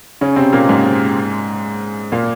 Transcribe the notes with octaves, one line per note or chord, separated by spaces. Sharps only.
C#3 C#4
C3 C4
A#2 A#3
G#2 G#3
A#2 A#3